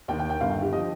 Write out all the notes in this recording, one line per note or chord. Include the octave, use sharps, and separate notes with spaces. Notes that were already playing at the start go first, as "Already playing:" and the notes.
D#2 D#3 G5
G5
G5
G1 G2 D3 F5
G4
F3 D#5